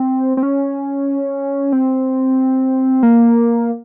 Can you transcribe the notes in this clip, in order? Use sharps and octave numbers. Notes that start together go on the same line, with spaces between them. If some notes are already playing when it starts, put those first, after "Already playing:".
Already playing: C4
C4
C#4
C4
A#3